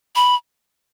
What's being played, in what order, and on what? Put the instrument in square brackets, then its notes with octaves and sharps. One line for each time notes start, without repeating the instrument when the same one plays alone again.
[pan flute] B5